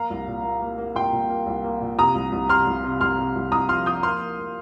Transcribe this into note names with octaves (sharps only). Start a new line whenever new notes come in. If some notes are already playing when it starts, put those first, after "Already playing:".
Already playing: A#3 F5 A#5
C2
A#2
A#3
A#3
A#3
A#2 G5 C6
A#2
A#3
C2
A#3
A#2
C3 A#5 D#6
C2
C2
C3 C6 F6
C2
C3
C2 C6 F6
C3
C2
C2 A#5 D#6
F3 C6 F6
F3 D#6 G6
A#3 C6 F6
A#3
A#3